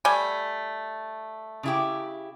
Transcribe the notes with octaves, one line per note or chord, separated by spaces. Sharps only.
G3 A3 G#5
C#3 E4 G4